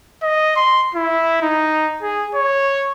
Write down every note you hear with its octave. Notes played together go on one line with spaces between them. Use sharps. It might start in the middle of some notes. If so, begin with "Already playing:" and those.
D#5
C6
E4
D#4
G#4
C#5